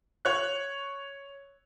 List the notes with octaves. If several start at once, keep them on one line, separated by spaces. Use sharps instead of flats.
C#5 F#6